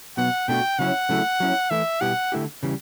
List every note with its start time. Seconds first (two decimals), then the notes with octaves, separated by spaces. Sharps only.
0.17 B2 F#3 B3 F#5
0.48 B2 A3 D4 F#4 G5
0.79 C#3 F#3 C#4 E4 F#5
1.09 C#3 F#3 A3 E4
1.40 F#3 C#4 E4
1.70 E3 A3 E4 E5
2.01 B2 G3 B3 E4 G4 F#5
2.32 D3 A3 E4 G4
2.63 C#3 E3 G3